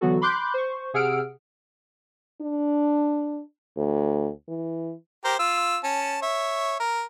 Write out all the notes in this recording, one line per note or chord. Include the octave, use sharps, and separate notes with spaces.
D3 E3 F#3 B3 F#4 A4
B5 C6 D6 F#6 G6
C5 C#6
C3 G#4 F#5 E6 F6 D7
D4
D2
E3
G4 A#4 C5
F4 E6
C#4 A5
C#5 E5
A#4